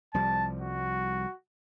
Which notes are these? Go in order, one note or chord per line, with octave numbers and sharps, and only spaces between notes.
C2 F3 G3 A5
F#4